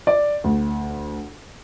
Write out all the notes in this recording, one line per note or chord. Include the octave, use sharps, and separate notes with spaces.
D5
D2